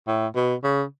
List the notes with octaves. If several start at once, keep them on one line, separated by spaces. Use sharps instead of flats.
A2
B2
C#3